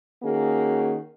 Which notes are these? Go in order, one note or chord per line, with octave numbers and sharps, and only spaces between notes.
D#3 A#3 C#4 F#4 G#4